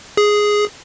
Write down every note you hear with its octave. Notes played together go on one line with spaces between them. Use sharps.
G#4